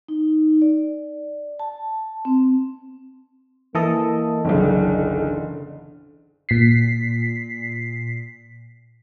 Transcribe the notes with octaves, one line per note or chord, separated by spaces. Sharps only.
D#4
D5
A5
C4
E3 A#3 A4 D#5
F#1 B1 D3
A#2 B6 C7